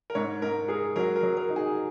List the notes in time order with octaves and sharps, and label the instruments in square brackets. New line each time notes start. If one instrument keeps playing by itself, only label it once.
[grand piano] A#4
[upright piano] G#2 [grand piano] C#5
[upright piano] G#2 [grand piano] A#4
[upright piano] G#4 [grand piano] A#4
[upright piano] F#3 [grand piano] A#4
[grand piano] A#4
[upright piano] F#3
[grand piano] A#4
[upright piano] D#4
[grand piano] G#4